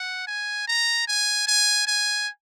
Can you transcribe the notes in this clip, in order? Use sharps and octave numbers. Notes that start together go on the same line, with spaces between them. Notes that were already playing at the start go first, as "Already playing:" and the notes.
Already playing: F#5
G#5
A#5
G#5
G#5
G#5